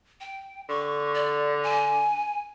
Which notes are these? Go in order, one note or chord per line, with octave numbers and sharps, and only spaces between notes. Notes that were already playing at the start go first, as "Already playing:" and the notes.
G5
D3 C#6
D5
G#5